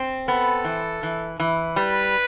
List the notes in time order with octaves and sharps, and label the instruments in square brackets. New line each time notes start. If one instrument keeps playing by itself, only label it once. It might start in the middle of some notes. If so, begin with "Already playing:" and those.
Already playing: [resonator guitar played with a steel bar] C4
[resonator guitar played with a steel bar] B3 [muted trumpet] A4
[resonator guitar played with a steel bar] E3
E3
E3
[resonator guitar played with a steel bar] G3 [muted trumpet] B4